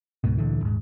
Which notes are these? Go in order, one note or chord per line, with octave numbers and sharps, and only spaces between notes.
C#2 G#2 B2
D2 A#2 D3 E3
D#1 G#2